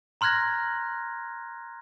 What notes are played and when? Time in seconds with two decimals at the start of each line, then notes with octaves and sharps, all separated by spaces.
0.21 A#5 C6 F6 F#6 G#6 A#6